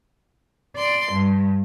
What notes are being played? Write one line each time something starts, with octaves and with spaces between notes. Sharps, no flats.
D5 C6
G2